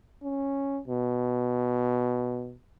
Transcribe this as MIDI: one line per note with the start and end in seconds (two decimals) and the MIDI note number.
0.23 0.80 61
0.88 2.55 47